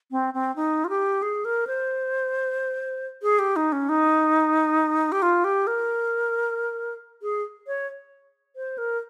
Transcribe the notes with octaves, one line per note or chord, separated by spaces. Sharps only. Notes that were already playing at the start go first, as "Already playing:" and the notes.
C4
C4
D#4
F4
G4
G#4
A#4
C5
G#4
G4
D#4
C#4
D#4
G4
F4
G4
A#4
G#4
C#5
C5
A#4